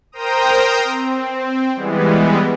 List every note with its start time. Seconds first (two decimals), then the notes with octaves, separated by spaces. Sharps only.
0.12 A#4 C5 G5 A#5 D#6
0.84 C4
1.75 E3 G3 G#3 B3